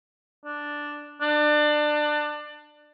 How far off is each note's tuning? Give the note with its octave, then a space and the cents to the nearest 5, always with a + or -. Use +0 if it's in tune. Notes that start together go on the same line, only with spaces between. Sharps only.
D4 +0
D4 +25